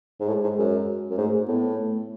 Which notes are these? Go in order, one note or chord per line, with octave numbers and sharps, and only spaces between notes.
G#2
A2 G#3
G#2
F#2
F#2
G#2 A3
A2 B3
A3